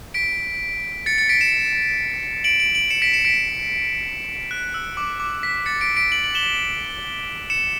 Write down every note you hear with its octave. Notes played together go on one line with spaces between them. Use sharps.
B6 D7
A6 C#7
A6 C#7
B6 D7
C#7 E7
D7 F#7
D7 F#7
D7 F#7
C#7 E7
B6 D7
C#7 E7
B6 D7
F#6
E6
D6
D6
B6
A6 C#7
B6 D7
B6 D7
D7 F#7
F#7
E7 G7
C#7 E7